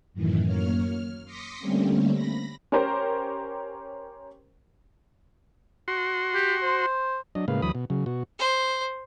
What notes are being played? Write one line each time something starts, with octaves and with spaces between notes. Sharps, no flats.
F#2 A2 D#3 E3
F#2 A#3 C#5 F6
F6
C6 D6 D#6 A#6 B6 C#7
D3 G3 A3 A#3 C4 C#4
B5 A#6
C#4 G4 A#4 C5
F#4 C6
G4
C5
F#3 D4 D#5
A2 C#3 G#3 A#3 B4 F5
D2 E3 F#3 B5 D#6
B2
C#3 F#3
B2 F#4
C5